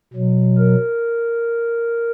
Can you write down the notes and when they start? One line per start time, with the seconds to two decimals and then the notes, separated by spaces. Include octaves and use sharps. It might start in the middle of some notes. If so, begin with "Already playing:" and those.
0.13 B2 F#3
0.58 A#4